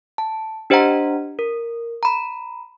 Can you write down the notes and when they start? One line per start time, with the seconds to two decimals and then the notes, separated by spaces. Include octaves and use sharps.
0.18 A5
0.70 D4 G4 C5 D#5 F#5 A#5
1.39 A#4
2.03 A#5 B5